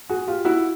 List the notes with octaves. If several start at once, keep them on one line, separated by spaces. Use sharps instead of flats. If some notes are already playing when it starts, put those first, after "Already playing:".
F#4 G#4
F4 G4
E4 F#4